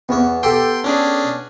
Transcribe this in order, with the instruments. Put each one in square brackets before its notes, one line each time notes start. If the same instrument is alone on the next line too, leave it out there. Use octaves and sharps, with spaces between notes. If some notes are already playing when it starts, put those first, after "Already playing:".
[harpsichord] E2 C#5 [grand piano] B3
[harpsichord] G4 A4 [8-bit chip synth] G5 C6
[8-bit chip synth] C#4 D4 G#4